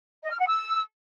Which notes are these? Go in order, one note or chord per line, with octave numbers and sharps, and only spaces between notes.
D#5
F6
F#5
E6